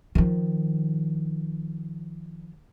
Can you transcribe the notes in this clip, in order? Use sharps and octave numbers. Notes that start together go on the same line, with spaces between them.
D#3 F3